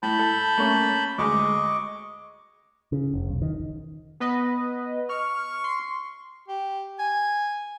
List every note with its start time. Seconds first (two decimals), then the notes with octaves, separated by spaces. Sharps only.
0.03 A2 A5 B5 G6
0.19 A4
0.58 A3 A#3 C#4
1.18 D2 G#3 G#4 D#5 C#6 D6
2.92 C#3
3.14 F1
3.29 B1
3.42 D#3
4.20 B3 B4 D#5
5.09 C#6 F6
5.64 C6
6.48 G4
6.99 G#5